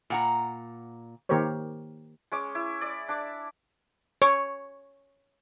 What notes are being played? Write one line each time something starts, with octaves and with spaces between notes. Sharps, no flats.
A#2 F#5 A#5
D#3 A#3 G4 A#4 C5 C#5
G#3 C#4 D6
E4
D5
D4 D6
C#5